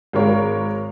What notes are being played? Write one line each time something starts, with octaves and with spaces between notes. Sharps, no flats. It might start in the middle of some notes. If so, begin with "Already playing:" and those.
G#1 G#3 A#4 C#5